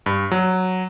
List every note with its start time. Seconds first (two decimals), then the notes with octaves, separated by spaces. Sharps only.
0.06 G2
0.31 F#3